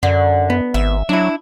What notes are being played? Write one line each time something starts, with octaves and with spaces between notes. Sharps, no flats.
F#2 D3
B3
G#1 E5
F#3 D4 E4